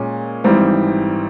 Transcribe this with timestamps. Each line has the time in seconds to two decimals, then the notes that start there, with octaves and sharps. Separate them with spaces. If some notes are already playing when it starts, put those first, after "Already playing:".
Already playing: A#2 G#3 C#4
0.44 G#1 G#2 E3 G3 C4